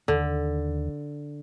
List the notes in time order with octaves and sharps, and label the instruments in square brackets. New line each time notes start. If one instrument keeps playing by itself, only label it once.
[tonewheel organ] D#2 [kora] D3